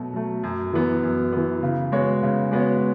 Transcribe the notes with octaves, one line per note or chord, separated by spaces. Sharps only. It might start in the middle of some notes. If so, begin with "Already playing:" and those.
Already playing: B2 F#3 A3
F#3 A3
F#2
E3 B3
F#2
E3 B3
C#3
G#3 B3 F#4 C#5
C#3
G#3 B3 F#4 C#5